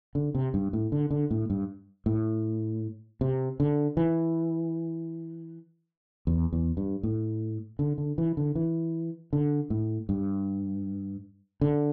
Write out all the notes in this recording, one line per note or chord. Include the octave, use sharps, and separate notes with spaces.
D3
C3
G2
A2
D3
D3
A2
G2
A2
C3
D3
E3
E2
E2
G2
A2
D3
D3
E3
D3
E3
D3
A2
G2
D3